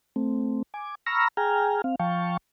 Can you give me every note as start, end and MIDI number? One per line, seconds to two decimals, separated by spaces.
0.16 0.62 57
0.16 0.62 60
0.74 0.95 80
0.74 0.95 86
1.06 1.28 82
1.06 1.28 83
1.06 1.28 85
1.06 1.28 88
1.06 1.28 89
1.06 1.28 94
1.37 1.81 68
1.37 1.81 79
1.37 1.81 80
1.37 1.81 82
1.37 1.81 89
1.84 1.95 60
1.84 1.95 77
1.99 2.37 53
1.99 2.37 77
1.99 2.37 79
1.99 2.37 81
1.99 2.37 85